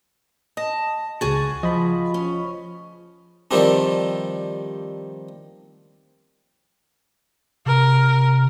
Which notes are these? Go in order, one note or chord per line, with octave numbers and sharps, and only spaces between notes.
D#5 A5 A#6
C#2 F#4 G#4 G#5 A6
F3 D#5 B5
C#4
D#3 F3 G3 C4 D4
C3 A#4